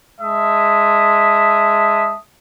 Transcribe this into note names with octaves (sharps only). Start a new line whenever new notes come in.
G#3 E5 A5 D#6